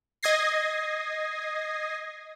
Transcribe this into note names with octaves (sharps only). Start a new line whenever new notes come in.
D#5 D#6 G#6 A#6 C7